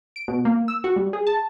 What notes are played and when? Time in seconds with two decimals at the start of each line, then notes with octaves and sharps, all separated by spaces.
0.16 D7
0.28 B2
0.45 A#3
0.68 E6
0.84 F#4
0.96 G3
1.13 G#4
1.27 A5